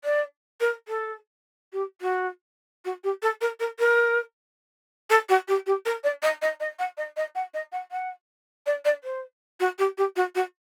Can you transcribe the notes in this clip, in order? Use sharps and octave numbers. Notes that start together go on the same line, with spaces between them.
D5
A#4
A4
G4
F#4
F#4
G4
A4
A#4
A#4
A#4
A4
F#4
G4
G4
A#4
D5
D#5
D#5
D#5
F#5
D#5
D#5
F#5
D#5
F#5
F#5
D5
D5
C5
F#4
G4
G4
F#4
F#4